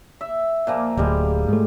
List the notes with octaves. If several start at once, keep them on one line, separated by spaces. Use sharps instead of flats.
E5
A#2 F3 A#3
D1 D2 G3 G#3
G#2 A3